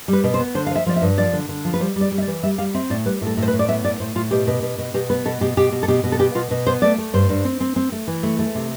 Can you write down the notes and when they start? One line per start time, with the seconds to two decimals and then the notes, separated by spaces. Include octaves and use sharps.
0.08 G3
0.13 B4
0.24 B2
0.34 C5
0.39 B3
0.55 D3 C5
0.67 F5
0.71 F3 E5
0.86 F3 D5
0.96 E5
1.02 G2
1.17 F3 D5
1.33 D3
1.49 D3
1.65 F3
1.74 B4
1.80 G3 C5
1.96 G3
2.01 D5
2.12 G3
2.18 E5
2.22 D5
2.27 E3
2.43 G3 E5
2.58 G3 F5
2.74 C4 E5
2.90 A2 D5
3.06 G3 B4
3.21 A2
3.27 A4
3.37 A2
3.42 C5
3.48 B4
3.53 A2
3.59 D5
3.68 B3 E5
3.84 A2 D5
4.00 A2 C5
4.15 A2 F4
4.31 B2 G4
4.47 B2
4.62 B2
4.78 B2
4.94 B2 G4
5.10 B3 B4
5.25 B2 A4
5.41 B2 G4
5.57 B2 G4
5.72 B2
5.83 A4
5.88 B2 G4
6.04 B2
6.12 A4
6.19 B3 G4
6.35 B2 F4
6.51 B2
6.66 B3 C5
6.82 A3 D5
6.98 A3
7.13 G2 C5
7.29 G2
7.45 C4
7.61 C4
7.76 C4
7.92 A3
8.07 E3
8.23 A3
8.39 A3
8.55 C3